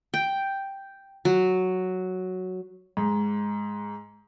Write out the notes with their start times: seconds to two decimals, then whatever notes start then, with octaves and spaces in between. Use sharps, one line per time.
0.14 G5
1.25 F#3
2.97 G#2